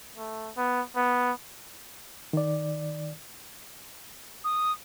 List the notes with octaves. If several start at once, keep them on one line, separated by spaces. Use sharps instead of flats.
A3
B3
B3
D#3 D5
D#6